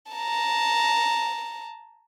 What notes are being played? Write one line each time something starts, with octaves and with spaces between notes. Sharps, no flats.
A5 A#5